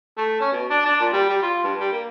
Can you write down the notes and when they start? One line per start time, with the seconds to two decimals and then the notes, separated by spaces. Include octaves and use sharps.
0.17 A3
0.40 C#4
0.52 B2
0.70 D4
0.85 D4
1.00 A#2
1.13 G3
1.29 G3
1.42 F4
1.64 G2
1.80 G3
1.92 A#3